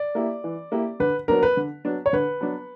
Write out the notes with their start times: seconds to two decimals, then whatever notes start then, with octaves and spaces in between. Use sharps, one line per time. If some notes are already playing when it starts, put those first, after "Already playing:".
Already playing: D5
0.15 A#3 E4 G4
0.44 E3
0.72 A#3 E4 G4
1.00 D3 B4
1.28 F#3 B3 D4 A#4
1.43 B4
1.57 D3
1.85 F#3 B3 D4
2.06 C#5
2.13 D3 B4
2.41 F#3 B3 D4